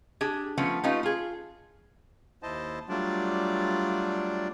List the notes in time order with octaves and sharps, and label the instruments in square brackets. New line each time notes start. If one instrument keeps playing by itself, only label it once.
[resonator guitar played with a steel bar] D4 G4 G#4
F3 A3 B3 C#4
A3 C#4 D#4 F4 G4 B4
F4 G#4
[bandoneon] D#2 E4 C5 D#5 A5
F#3 G3 A3 D4 F4 D5